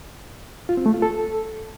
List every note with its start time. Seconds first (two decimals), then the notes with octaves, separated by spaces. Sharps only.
0.69 F4
0.77 C4
0.86 A3
0.94 F4
1.02 A4